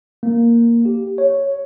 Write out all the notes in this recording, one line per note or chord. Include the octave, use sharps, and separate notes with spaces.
A#3
G4
C#5